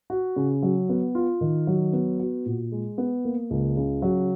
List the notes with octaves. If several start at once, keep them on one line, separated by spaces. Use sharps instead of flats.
F#4
C#3
F#3
B3
F4
D#3
F#3
B3
F#4
A#2
G#3
B3
A#3
C#2
C#3
F#3